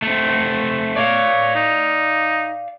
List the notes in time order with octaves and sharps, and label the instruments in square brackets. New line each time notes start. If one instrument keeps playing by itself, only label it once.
[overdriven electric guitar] A3 C4
[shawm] C#5 [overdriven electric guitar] D5 F5
[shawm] D#4